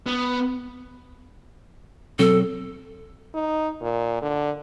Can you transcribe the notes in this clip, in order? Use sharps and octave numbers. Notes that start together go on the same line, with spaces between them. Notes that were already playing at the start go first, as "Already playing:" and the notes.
B3
B2 F#3 C4 A4
D#4
A#2
D3